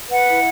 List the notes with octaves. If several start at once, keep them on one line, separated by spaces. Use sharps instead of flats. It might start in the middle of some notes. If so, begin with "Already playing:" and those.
B4 F#5
E4